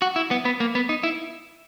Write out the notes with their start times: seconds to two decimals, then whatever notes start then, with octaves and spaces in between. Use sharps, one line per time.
0.02 F#4
0.16 E4
0.31 B3
0.45 B3
0.60 A#3
0.75 B3
0.89 D#4
1.03 E4